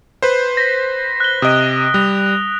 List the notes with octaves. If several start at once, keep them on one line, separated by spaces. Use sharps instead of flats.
B4 C5
A#6 B6
F#6 G7
C3 D#5 D#6 D7
G3 F#6 F7